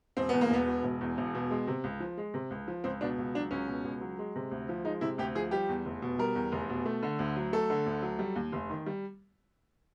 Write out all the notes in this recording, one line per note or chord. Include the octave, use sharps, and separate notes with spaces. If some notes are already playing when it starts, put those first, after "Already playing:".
E1 C4
E2 B3
A#3
E1 B3
B2
E1
E2
E1
B2
G#3
C3
C#2
F3
G#3
C3
C#2
F3
C#2 C4
B2 D4
C#2
F#3 D4
C#2 C#4
B2
C#2
F#3
G#3
C3
D2
F3
G#3 D#4
C3 E4
D2 G4
F3 G#4
G3 G4
E2
F1
B2
G3 A#4
E2
F1
B2
A3
D3
D2
F#3
A3 A4
D3
D2
F#3
G3
D#2
F1
D#3
G3